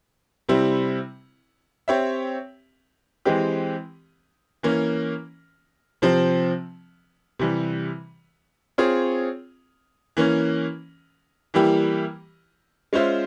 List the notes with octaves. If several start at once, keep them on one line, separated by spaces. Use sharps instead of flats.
C3 G3 C4 E4
C4 G4 C#5 E5
E3 G#3 C4 G4
E3 A#3 C#4
C3 F3 C4
C3 E3 G3
C4 F4 G#4 C#5
E3 A#3 C#4
E3 G3 A#3 E4 G4
G#3 C#4 F4 C5 E5